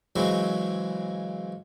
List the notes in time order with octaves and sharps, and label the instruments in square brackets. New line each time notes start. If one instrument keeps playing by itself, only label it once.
[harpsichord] C#3 E3 F#3 G#3 C4 F#4